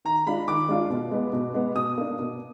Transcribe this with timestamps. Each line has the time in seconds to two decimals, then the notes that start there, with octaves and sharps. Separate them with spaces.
0.05 D#3 A#5
0.26 G#3 D4 F4 B5
0.48 D#3 D6
0.69 G#3 D4 F4
0.90 B2
1.11 G#3 B3
1.33 B2
1.54 G#3 B3
1.75 B2 D#6
1.98 A#3 D4
2.18 B2